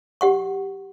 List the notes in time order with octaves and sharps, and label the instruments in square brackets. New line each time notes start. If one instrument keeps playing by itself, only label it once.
[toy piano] G4 F#5 C#6